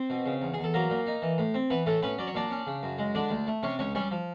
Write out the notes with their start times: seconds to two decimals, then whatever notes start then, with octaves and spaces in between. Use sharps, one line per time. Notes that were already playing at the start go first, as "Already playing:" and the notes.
Already playing: C4 C5
0.10 B2
0.26 C#3
0.42 E2
0.54 E2 G#4
0.64 A4
0.74 F#3 A#3 A#4
0.90 A#2
1.06 D#4
1.22 E3
1.38 A2
1.54 C4
1.70 E3 B3 B4
1.86 A2 A3 A4
2.03 B3 C#4 B4
2.18 F#3 D5
2.27 C#5
2.35 A#2 D4 D5
2.51 C#4
2.67 C#3
2.83 F#2
2.98 G#3
3.15 D3 D4 D5
3.30 D2
3.47 A3
3.63 C3 C#4 C#5
3.79 C#2 C#4 C#5
3.95 G3 C#4 C#5
4.11 F3